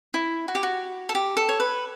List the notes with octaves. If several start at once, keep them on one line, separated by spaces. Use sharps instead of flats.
E4
F#4
G4
F#4
A4
G4
A4
C#5
B4